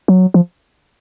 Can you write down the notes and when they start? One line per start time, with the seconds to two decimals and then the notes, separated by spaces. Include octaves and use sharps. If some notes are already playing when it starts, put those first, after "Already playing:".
0.08 F#3
0.34 F3